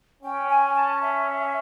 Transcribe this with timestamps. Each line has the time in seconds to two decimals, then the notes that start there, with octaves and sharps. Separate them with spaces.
0.23 C#4 G5
0.49 G#5
0.75 A5
1.01 E5